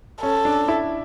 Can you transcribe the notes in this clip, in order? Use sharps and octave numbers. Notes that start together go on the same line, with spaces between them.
C#4 A4
D4
E4